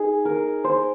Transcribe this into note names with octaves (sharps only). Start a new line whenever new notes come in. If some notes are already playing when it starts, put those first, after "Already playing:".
Already playing: D#4 G#4
A#4
C5